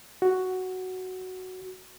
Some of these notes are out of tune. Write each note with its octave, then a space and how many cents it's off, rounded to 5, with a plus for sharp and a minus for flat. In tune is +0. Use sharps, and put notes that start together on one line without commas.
F#4 +5